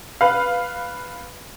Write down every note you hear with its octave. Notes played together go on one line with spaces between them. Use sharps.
B4 F5